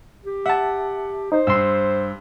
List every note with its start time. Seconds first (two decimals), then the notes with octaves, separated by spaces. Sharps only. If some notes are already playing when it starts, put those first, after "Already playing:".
0.25 G4
0.46 E5 F#5 A5
1.32 D#4 C5
1.47 G2 C6 E6